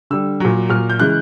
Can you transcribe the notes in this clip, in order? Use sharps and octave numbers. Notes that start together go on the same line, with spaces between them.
D3 G3 E6
A#2 F#3
A#2 F#3 F6
G6
C#3 E3 G#3 F#6